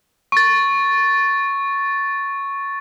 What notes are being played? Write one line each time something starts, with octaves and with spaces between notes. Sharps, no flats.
C#6 A6